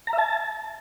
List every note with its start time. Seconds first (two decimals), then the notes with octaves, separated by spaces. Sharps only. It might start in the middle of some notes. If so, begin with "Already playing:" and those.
0.07 A#5
0.13 E5
0.18 A5